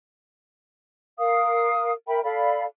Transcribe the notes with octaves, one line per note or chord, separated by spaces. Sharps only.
A#4 F5 D#6
A#4 E5 G5 B5
A4 D5 F5 B5